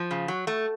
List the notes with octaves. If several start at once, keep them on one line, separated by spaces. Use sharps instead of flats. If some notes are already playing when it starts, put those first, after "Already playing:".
Already playing: F3
C#3
F#3
A3